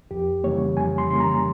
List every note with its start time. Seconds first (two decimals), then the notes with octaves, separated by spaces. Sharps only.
0.11 F2 G4
0.44 C#3 E3 G3 A#3 C#5
0.77 F2 G#5
0.98 C6
1.09 C#3 E3 G3 A#3 C6
1.20 A#5